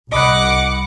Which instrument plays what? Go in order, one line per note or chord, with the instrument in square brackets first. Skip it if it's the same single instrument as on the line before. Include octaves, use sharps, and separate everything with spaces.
[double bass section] C2 [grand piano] D#5 B5 F#6 [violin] F#5 D6